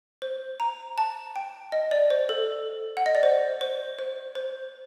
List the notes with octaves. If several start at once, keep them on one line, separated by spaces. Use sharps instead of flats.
C5
A#5
A5
G5
D#5
D5
C5
A4
F#5
D#5
D5
C5
C5
C5
C5